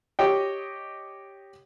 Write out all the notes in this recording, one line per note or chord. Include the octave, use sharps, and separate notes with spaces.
G4 C#5 D#5 G5